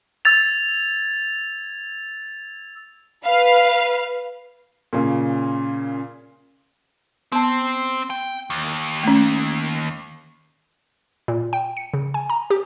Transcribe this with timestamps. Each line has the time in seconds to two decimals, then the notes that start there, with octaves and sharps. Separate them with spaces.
0.25 E6 G#6 A6 F7
3.24 B4 F5
4.93 A#2 C#3
7.32 B3 C4 C5 A5
8.10 G5
8.50 D#2
9.04 A3 C#4
11.28 A#2
11.53 G5
11.77 C#7
11.94 C#3
12.14 G#5
12.30 A#5
12.50 G4